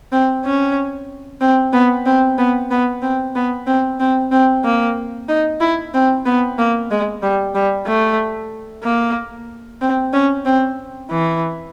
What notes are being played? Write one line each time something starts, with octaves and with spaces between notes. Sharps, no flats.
C4
C#4
C4
B3
C4
B3
B3
C4
B3
C4
C4
C4
A#3
D#4
E4
C4
B3
A#3
G#3
G3
G3
A3
A#3
C4
C#4
C4
E3